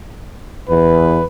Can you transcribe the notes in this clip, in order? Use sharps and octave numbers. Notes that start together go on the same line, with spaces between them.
E2 B4